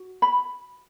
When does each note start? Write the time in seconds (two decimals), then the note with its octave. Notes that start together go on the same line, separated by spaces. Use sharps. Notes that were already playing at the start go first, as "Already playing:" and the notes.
Already playing: F#4
0.22 B5